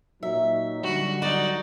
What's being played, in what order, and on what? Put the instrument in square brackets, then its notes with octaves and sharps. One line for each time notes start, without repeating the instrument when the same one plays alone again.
[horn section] A#2 F#3 D#4 [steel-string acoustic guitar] E5
[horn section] D3 F#3 G3 [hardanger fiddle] F#4
[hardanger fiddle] D#4 D5 [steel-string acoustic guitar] F#4